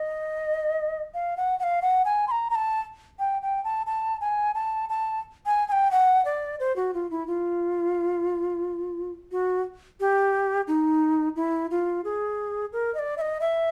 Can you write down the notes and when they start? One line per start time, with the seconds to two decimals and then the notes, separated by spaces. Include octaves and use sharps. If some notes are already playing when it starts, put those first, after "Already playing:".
Already playing: D#5
1.14 F5
1.37 F#5
1.59 F#5
1.63 F5
1.82 F#5
2.05 G#5
2.28 C6
2.31 A#5
2.50 A#5
2.55 A5
3.19 G5
3.42 G5
3.64 A5
3.87 A5
4.21 G#5
4.55 A5
4.89 A5
5.46 G#5
5.68 G#5
5.72 G5
5.91 F#5
6.25 D5
6.60 C5
6.76 F#4
6.94 F4
7.11 E4
7.27 F4
9.31 F#4
10.00 G4
10.67 D#4
11.36 E4
11.71 F4
12.05 G#4
12.73 A#4
12.94 D#5
12.99 D5
13.18 E5
13.21 D#5
13.41 E5